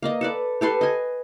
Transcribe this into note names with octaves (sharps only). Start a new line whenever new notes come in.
A#3 D5 D#5
A4 B4 D5
G4 A4 B4 C6
D#5 G#5